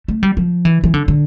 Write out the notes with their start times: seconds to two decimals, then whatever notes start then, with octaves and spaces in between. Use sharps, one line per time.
0.08 A3
0.23 G3
0.37 F3
0.65 E3
0.84 E3
0.94 D3
1.08 D3